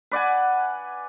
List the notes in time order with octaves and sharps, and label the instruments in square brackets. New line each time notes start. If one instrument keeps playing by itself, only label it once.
[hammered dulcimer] B4 D5 F#5 G#5